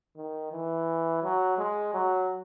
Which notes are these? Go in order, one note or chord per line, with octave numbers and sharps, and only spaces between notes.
D#3
E3
F#3
G#3
F#3